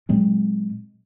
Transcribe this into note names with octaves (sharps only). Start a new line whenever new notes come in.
A#2 F#3 G#3 C4